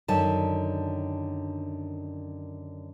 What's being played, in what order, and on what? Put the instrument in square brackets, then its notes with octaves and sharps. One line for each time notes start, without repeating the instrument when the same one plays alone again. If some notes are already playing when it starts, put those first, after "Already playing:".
[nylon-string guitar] F#2 D3 D#3 A5